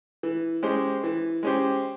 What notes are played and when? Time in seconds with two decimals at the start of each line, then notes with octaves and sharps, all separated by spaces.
0.23 E3
0.63 G#3 C#4 G4 C5
1.04 E3
1.43 G#3 C#4 G4 C5